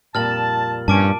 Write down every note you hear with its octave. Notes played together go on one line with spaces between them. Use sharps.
F2 A#2 G3 A5 F6 A6 F#7
G2 C#4 A5 D6 D7